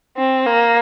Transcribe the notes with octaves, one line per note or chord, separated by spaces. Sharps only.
C4
A#3